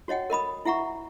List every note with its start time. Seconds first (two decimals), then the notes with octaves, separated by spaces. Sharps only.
0.08 F#4 C#5 D#5 F#5 G5
0.30 A#4 D#5 B5 D#6
0.65 E4 E5 F#5 A#5 C#6